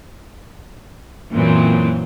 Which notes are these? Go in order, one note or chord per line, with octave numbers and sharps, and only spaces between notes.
F#2 A#2 E3 F#3 C4